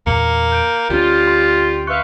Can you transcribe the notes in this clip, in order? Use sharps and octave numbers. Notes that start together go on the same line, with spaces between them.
E2 A#2 A#3 C#7
G6 D7
D2 G3 C#4 F4 G6
C6
B4 E5 F5 C#6 F#6 C#7